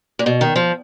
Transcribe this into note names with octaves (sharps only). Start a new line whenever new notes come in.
A#2
B2
D#3
F3